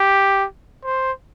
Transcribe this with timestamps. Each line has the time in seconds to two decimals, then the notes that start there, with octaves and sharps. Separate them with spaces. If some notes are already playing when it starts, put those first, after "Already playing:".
Already playing: G4
0.85 C5